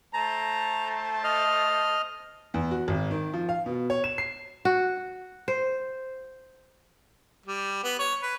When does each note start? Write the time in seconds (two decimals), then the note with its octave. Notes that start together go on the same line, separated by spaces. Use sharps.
0.13 A3 C5 A5 A#5
1.24 D#5 F6
2.54 E2
2.71 F#4
2.88 G#1
3.11 D#3
3.33 F3
3.49 F5
3.66 B2
3.90 C#5
4.04 E7
4.18 C7
4.65 F#4
5.48 C5
7.46 G3
7.84 B3
7.99 C#5
8.23 B4